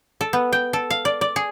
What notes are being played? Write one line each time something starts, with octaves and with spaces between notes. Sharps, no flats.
A4
B3
G5
A4
F5
D5
D5
G#4